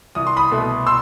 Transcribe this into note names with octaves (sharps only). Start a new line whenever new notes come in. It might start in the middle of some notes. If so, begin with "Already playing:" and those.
C2 D#6
C6
B5 D#6
B2 A3
C6 E6